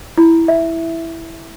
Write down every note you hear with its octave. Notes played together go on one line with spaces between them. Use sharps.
E4
E5